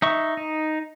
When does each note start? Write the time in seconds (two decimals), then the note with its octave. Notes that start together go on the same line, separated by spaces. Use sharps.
0.02 D#4 E5 C#6
0.37 D#4